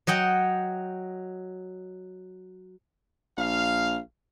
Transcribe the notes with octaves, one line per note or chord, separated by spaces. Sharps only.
F#3 D#5 F#5 G5
A#1 F5